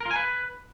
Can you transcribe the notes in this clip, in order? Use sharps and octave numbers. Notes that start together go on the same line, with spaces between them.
A#4
F4
G#5
B4